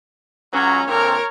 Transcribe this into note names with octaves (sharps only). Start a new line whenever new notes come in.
C#2 F#3 C#4 A#5
A#2 D3 C4 A#4 C#5